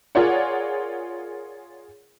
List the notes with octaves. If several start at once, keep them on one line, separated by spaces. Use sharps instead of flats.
F4 G#4 A#4 C#5 D5 F#5